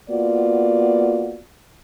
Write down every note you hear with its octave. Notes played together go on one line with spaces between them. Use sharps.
A#3 B3 F4 F#4 D5